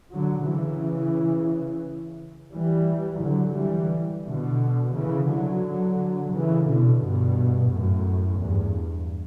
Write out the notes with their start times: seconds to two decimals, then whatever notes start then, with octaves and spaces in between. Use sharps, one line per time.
0.12 D3 F#3
0.47 C#3 E3
2.54 E3 G3
3.23 D3 F#3
3.57 E3 G3
4.26 B2 D3
4.95 C#3 E3
5.30 D3 F#3
6.33 C#3 E3
6.67 B2 D3
7.01 G2 B2
7.71 F#2 A2
8.39 E2 G2